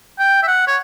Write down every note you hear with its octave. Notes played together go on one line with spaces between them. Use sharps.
G5
E5
F#5
C#5